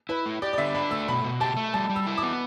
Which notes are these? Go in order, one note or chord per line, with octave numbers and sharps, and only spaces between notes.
E4 B4
A3
G4 D5
D5
D3 E5
D4 B5
A3 E6
B2 B5
B2
G4 A5
A3
G3 A5
G3
E6
E4
D6
B3